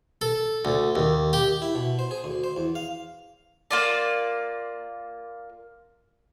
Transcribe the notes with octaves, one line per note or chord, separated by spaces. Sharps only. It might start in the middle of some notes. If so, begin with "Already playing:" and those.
A4
D2
D#2
G4
E4
B2
C5
G#4
D2
C5
E2
F5
A#3 F4 D5